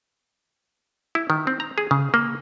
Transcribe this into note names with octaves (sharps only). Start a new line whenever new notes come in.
E4
D#3
C4
A#5
G#4
C#3
A#3